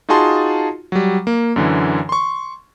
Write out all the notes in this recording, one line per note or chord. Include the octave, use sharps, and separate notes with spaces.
D#4 F4 F#4 G#4 A5 C6
F#3 G3
A#3
F#2 D3 E3
C6 C#6